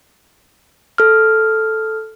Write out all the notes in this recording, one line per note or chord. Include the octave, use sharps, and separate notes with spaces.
A4 F6